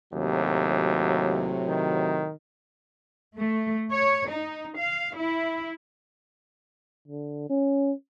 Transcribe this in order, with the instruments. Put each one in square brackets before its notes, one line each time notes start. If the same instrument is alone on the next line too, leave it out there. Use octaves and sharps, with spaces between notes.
[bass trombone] D#2 [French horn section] A2 C3 F#3
[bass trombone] D#3
[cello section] A3
C#5
D#4
F5
E4
[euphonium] D3
C#4